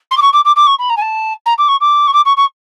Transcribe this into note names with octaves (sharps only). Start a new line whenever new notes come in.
C6
D6
C#6
D6
D6
D6
C#6
B5
A#5
G#5
A5
A#5
D6
C#6
D6
C#6
D6
C#6
C#6